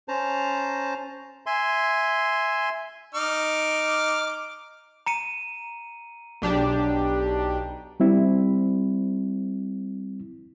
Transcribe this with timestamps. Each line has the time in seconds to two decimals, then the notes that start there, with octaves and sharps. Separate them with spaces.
0.08 C#4 C5 A5 A#5
1.46 E5 G#5 C6
3.15 D#4 D6 F6
5.06 A#5 C#7 D#7
6.42 B1 D4 G4
8.00 G3 C4 E4